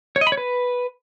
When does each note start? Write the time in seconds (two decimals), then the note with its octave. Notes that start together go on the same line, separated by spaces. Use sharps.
0.16 C#5
0.21 D#5
0.27 B5
0.32 C#5
0.37 B4